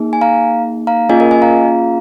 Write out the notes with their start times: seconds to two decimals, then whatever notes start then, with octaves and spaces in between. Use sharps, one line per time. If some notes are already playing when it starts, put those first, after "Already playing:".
Already playing: A#3 D#4 G#4
0.13 G#5
0.21 F5 A#5
0.87 F5 A#5
1.09 A#3 C#4 F4 G#4 D#5 G#5
1.20 A#4 D#5
1.31 D#5 G#5
1.42 F5 A#5